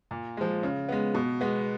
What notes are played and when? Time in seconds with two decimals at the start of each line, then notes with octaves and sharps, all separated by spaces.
0.11 A#2
0.37 F3 G#3
0.63 C#3
0.89 G#3 B3
1.15 B2
1.41 G#3 B3